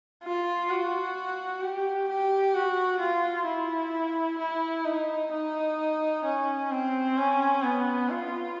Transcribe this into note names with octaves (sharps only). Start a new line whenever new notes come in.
F4
F#4
G4
G4
F#4
F4
E4
E4
D#4
D#4
C#4
C4
C#4
B3
F4